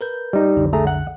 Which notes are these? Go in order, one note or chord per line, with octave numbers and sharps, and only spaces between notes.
A#4 B4 G6
G3 D#4
B1 F2 D3
A3 G#4 A#5
F#5